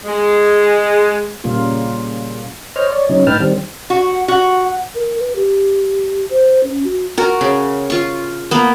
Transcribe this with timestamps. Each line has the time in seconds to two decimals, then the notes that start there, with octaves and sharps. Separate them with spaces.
0.05 G#3
1.44 A#2 C#3 G3 A#3 F4
2.76 C5 C#5 D#5 F6
2.92 C#5 D5
3.09 C#3 F#3 C#4 D#4
3.27 A2 D#4 B4 G5 A5 F6
3.40 D#3 G3 C4
3.90 F#4
4.28 F#4
4.95 A#4
5.19 B4
5.35 G4
6.30 C5
6.63 C#4
6.84 F#4
7.17 F#4 A#4
7.41 C#3
7.90 F4 C#6
8.51 A#3 B3